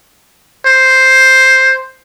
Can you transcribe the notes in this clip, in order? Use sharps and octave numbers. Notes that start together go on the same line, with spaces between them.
C5